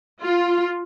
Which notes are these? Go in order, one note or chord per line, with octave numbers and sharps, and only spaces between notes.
F4